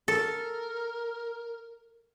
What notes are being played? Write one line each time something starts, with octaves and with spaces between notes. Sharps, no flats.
A4 A#4